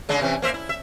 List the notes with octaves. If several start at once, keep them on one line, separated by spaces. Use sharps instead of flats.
C#3 G#3 D4
C3 E3 C#4
A#3 C5 E5
E4
E5